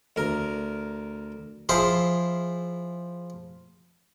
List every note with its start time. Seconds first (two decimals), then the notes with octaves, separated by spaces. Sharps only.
0.16 D2 A#4
1.69 F3 E4 G#4 C5